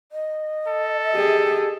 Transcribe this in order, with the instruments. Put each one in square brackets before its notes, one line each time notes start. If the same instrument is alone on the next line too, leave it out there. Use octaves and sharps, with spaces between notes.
[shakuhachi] D#5
[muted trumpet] A4
[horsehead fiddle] G4 G#4